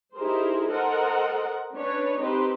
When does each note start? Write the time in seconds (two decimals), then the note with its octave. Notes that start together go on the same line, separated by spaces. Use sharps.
0.16 D#4 E4 G4 G#4 A#4 C5
0.69 A4 A#4 C5 D#5 F#5
1.74 C#4 D4 B4 C#5
2.20 C4 D#4 G4 B4 C5